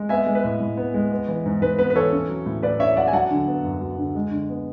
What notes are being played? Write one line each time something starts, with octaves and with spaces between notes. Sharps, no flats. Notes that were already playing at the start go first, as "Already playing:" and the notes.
Already playing: G#3
B3 E5 G#5
G#3
B4
A2
A2
B3
G#3
B3
E3
G#2
G#2 B4
B3 B4
B4
E3 A4 C#5
C#4
F#3
A2
A2 B4 D5
C#4 C#5 E5
F#3 D5 F#5
G#5
F#3 F#5 A5
D3
B3
F#2
F#3
D3
G#3
D3
B3